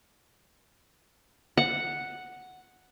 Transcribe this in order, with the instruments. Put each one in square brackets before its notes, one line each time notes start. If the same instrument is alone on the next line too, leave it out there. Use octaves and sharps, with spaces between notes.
[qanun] F#5